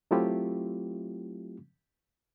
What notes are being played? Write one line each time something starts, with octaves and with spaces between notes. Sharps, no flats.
F#3 A3 C4 E4 F4 G4